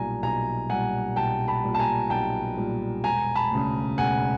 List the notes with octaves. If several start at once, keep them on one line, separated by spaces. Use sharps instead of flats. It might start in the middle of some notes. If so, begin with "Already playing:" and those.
Already playing: B1 A#2 G3 G#5 A#5
B1 G#5 A#5
A#2 G3 F#5 G#5
B1 G5 A5
A5 B5
A#2 G3
A5
G#5 A#5
B1 G5 A5
A#2 G3
E1 G#5 A#5
A5 B5
D2 C#3
E1 F#5 G#5